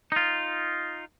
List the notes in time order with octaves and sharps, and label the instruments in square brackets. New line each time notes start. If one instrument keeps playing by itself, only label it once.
[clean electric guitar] D#4 F4